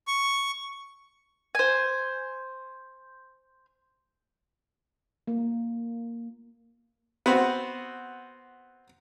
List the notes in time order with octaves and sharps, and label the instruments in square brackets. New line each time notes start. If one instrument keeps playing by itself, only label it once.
[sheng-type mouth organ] C#6
[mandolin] C5 G#5
[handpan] A#3
[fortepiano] B3 C4 F#4